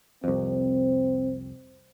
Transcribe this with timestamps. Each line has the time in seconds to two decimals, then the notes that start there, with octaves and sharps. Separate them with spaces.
0.24 C2 F2 C4